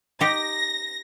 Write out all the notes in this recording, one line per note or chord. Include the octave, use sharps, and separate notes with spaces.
D#4 G4 A#6